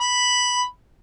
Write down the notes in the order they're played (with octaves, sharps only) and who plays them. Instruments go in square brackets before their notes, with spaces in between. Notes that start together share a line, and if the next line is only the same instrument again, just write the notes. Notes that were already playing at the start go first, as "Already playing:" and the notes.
[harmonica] B5